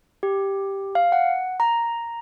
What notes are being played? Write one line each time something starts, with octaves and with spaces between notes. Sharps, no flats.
G4
F5
F#5
A#5